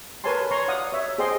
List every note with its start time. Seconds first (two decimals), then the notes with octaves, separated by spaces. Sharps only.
0.24 A#4 B4 C#5 G#5 A5 C6
0.51 C#5 A#5 C6 C#6
0.68 D5 F5 F#5 D#6
0.92 C#5 E5
1.18 G#4 C5 D#5 G5 C6